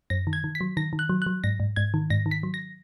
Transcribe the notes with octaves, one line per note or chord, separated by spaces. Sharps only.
F#2 A#6
D#3
G#6
D#3
B6
F#3
D#3 A#6
D#3
F#6
F#3
F#3 F#6
G#2 A#6
G#2
G#2 G#6
D#3
G#2 A#6
D#3
B6
F#3
A#6